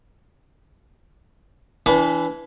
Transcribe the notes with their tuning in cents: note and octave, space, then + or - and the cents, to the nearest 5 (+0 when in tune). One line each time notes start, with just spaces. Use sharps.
E3 +5 D4 -35 B4 +0